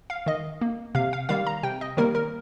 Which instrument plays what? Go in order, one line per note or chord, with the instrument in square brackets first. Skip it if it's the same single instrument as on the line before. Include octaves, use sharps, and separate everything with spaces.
[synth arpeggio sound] F5
D#3 D#5
A#3
C3 F5
F5
D#3 G3 A#3 F5
A#5
C3 G5
D#5
D#3 G3 A#3 A#4
A#4